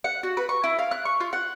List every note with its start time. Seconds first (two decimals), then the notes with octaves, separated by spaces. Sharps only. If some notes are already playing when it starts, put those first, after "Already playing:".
0.04 F#5
0.23 F#4
0.37 B4
0.49 C#6
0.64 E4
0.79 F5
0.91 F#6
1.05 C#6
1.20 F4
1.33 F#5